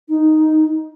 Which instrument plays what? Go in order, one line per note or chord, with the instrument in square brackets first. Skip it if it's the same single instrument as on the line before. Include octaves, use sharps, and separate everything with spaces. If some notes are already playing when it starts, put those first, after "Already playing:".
[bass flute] D#4